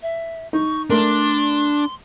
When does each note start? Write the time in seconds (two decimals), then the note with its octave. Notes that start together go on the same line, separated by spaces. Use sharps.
0.03 E5
0.53 D#4 C#6
0.90 A3 D4 A#4 C6